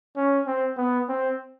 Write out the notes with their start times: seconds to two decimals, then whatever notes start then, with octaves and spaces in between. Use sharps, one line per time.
0.16 C#4
0.47 C4
0.77 B3
1.08 C4